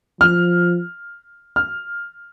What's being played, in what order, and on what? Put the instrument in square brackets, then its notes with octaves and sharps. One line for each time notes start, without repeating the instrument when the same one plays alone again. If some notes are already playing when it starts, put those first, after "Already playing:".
[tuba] F3 [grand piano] F6
[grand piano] F6